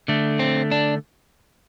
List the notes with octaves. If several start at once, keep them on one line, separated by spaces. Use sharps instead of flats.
D3 A3
C4
D4